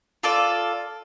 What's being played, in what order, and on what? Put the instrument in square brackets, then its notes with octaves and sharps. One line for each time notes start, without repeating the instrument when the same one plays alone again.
[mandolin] F4 A4 D5